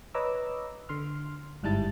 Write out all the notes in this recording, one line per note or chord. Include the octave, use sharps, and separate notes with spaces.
B4 C#5 D#5 A#5 D6 E6
D3 C6 F6
G1 G#2 G3 E4 A5 A6